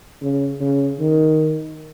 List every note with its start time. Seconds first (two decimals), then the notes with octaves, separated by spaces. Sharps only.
0.22 C#3
0.61 C#3
1.00 D#3